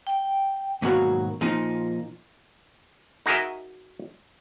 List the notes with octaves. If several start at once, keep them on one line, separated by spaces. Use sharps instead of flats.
G5
G#2 B2 D#3 F#3 A#3 F#4
A#2 F3 D#4
D#4 F#4 G#4 A#4 D#5 E5